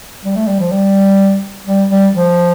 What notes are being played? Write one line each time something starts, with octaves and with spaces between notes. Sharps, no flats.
G3
A3
G3
F3
G3
G3
G3
F3